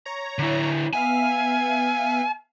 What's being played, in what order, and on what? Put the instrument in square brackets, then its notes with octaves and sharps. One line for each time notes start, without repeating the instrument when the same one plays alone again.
[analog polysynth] C#5 A#5
[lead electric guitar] D3 E4
[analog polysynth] B3 E5 F5 [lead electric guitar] G#5